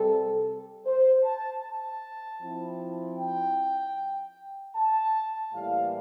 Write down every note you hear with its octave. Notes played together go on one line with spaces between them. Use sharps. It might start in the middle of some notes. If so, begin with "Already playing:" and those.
Already playing: C3 G3 C4 A4
C5
A5
A5
F3 C4 E4
G5
A5
A2 E3 G3 A#3 F5